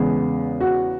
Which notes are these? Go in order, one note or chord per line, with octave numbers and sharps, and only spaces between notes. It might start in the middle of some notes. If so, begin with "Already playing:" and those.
Already playing: E2 C#3 G#3 B3 G#4
F#4